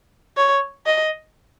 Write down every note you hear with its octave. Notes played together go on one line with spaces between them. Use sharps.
C#5
D#5